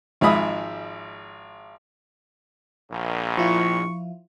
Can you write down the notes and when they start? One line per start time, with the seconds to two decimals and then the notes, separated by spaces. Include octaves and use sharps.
0.21 G#1 F3 G#3 E5 B5 D#6
2.90 A#1
3.38 F3 E4 F4 C#6